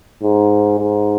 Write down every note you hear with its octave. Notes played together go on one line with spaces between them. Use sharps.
G#2
G#2